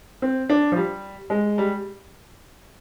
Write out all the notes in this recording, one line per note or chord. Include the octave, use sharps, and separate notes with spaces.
C4
D4
F3
G3
G#3
G3